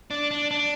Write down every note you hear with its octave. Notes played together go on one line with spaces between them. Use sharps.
D4
D4
D4